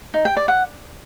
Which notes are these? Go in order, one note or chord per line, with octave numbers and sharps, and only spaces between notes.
D#4
G5
D5
F#5